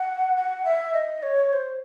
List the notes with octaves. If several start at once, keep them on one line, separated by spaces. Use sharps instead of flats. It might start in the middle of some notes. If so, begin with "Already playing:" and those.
Already playing: F#5
F#5
E5
D#5
C#5
C5